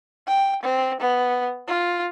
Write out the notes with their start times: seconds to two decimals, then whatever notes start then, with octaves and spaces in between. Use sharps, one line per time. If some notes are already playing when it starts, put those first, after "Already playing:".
0.27 G5
0.63 C4
1.00 B3
1.68 F4